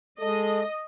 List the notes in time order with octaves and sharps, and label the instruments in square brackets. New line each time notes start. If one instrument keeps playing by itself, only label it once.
[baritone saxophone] G#3 [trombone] A4 [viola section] D#5